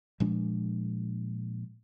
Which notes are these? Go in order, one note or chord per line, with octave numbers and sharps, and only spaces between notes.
A#2 F3 G#3 D4